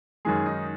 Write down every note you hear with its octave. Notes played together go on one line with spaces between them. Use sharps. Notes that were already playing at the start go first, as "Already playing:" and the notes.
F#2 D#3 G#3 G#4
D#4